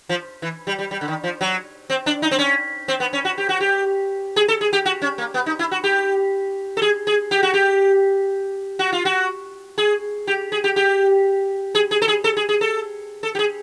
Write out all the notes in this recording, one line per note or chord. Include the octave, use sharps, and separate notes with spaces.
F3
E3
G3
G3
G3
D3
D#3
F3
F#3
C4
D4
D#4
C4
C#4
C4
B3
C#4
F#4
G4
F#4
G4
G#4
A4
G#4
G4
F#4
C#4
A#3
B3
D#4
E4
F#4
G4
A4
G#4
G#4
G4
F#4
G4
F#4
F4
F#4
G#4
G4
G#4
G4
G4
G#4
G#4
A4
G#4
A4
G#4
G#4
A4
A4
G4
G#4